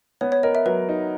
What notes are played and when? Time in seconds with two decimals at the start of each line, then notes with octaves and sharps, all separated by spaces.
0.21 B3 C#5
0.32 C#5
0.43 A#4 D#5
0.55 E5
0.66 F#3 B4
0.89 D#4